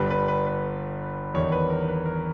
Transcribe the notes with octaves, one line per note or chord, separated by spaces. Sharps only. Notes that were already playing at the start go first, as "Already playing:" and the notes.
Already playing: G1 G2 G3 B4
B4
B4
B4
E2 D#3 G3 C#5
B4
A#4
B4
A#4